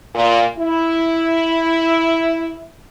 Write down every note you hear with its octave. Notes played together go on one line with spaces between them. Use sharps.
A#2
E4